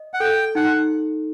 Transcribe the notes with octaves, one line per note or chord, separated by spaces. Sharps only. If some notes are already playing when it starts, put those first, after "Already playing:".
Already playing: D#5
F#5
A4 G5
D#4 F#5